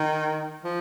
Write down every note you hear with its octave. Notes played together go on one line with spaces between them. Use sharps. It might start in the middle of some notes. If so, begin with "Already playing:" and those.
Already playing: D#3
F3